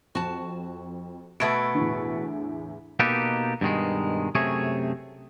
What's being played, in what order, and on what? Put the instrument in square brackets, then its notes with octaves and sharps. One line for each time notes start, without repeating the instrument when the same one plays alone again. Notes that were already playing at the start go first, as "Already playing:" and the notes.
[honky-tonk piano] F2 [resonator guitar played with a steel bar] F#4 A5
[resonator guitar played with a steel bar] B2 A3 B3 [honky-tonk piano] E6 G#6 D7
[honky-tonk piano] E2 A2 D3
[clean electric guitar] B2 A#3 D#4 G4 A4 B4
G2 B2 D#3 G#3
F#2 C3 A3 G#4 C#5